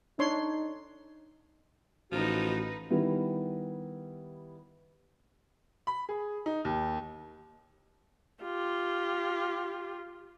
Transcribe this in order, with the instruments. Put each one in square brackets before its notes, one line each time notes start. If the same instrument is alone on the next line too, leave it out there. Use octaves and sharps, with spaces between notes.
[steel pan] D4 C#5 C6 [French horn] D#4
[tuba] A1 [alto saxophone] F3 [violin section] D#4 B4 [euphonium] F#4
[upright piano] D#3 G3 B3 E4
B5
G#4
D#4
D#2
[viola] F4 G4